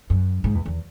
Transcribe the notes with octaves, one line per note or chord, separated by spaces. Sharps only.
F#2
G#2
E2
E2